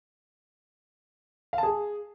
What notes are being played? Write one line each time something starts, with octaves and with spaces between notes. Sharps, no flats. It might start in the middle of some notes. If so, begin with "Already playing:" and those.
F5
A5
G#4